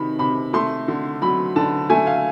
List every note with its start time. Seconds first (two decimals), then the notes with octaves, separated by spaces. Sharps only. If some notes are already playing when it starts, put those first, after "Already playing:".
Already playing: C3 D#3 B5
0.19 C3 B5
0.53 A3 C6
0.88 D3
1.22 F#3 B5
1.56 D3 A5
1.90 A3 G#5
2.07 F5